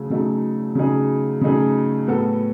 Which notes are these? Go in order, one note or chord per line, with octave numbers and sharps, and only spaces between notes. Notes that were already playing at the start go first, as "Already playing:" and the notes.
Already playing: C#3 F#3 A3 G#4
C#3 F#3 A3 D#4 G#4
C#3 F#3 A3 D#4 G#4
C#3 F#3 A3 D#4 G#4
A2 F#3 B3 F#4 A4